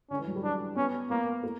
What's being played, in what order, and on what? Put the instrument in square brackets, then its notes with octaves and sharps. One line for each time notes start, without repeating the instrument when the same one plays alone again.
[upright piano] D3 [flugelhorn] C#4
[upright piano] E3
F#3
G3
[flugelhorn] D4
[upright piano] B3 [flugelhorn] C#4
[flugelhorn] A#3 [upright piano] B3
[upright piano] A#3